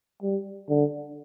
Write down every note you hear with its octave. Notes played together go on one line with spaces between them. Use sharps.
G3
D3